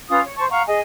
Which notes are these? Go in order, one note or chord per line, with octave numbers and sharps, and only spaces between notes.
C#4 F4 B4 D#6
C#5
C5 A5 C#6
F5 F#5 A#5 C#6
G#4 D#5 G#5